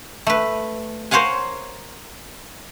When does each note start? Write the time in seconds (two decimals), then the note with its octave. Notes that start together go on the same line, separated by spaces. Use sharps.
0.27 A3 B4
1.11 A#4 C5 C#5 F5 F#5 G#5